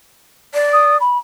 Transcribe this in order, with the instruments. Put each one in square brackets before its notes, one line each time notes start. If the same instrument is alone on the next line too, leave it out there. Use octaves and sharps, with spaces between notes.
[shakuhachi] D5
[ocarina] D#6
B5